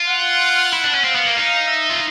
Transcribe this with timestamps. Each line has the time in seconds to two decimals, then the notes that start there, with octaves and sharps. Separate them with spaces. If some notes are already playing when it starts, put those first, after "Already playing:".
Already playing: F4
0.08 F#5
0.73 E4
0.84 D4
0.94 C#4
1.04 C4 F5
1.15 B3
1.26 A#3
1.36 D#4 F5
1.68 E5
1.90 F4